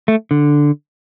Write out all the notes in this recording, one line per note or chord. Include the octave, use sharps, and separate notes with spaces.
A3
D3